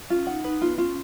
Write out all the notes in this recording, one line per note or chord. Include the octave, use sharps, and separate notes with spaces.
C#4 F4
D#4 F#5
D#4 B4
B3 F4
C#4 F4